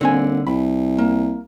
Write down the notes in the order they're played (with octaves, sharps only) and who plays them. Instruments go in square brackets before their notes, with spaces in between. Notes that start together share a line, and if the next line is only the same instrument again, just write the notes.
[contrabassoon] D#1 [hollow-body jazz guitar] D3 C4 G#5
[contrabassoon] C2 [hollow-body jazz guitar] B5
[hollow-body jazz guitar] A#3